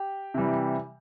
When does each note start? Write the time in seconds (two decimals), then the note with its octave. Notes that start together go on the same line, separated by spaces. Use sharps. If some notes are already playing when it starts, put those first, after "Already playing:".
Already playing: G4 G5
0.34 C3 E3 G3